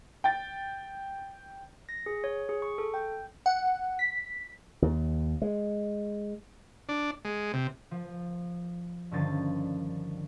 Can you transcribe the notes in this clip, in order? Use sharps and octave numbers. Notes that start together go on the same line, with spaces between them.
G5 A6
A#6
G#4
C#5
G#4
C#6
A4
G5
F#5
B6
D#2
G#3
D4
G#3
C3
F3
G2 D3 D#3 F3 C#4 A6